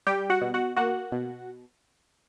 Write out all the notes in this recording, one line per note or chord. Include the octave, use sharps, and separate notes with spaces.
G3 G4 G5
F#4 F#5
B2
F#4 F#5
A#3 F#4 F#5
B2